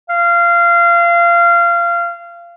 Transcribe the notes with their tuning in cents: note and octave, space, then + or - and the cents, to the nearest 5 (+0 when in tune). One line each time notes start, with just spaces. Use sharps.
F5 -25